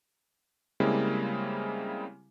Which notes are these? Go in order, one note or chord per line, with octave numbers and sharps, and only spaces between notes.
C#3 G3 G#3 A#3 C4 E4